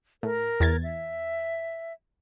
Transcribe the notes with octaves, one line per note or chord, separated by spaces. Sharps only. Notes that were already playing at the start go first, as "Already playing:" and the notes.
A2 A#4
E2 G#6 A6
E5